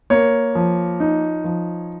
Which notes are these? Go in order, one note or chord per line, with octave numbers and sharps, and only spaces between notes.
A#3 C#5
F3
D#4
F3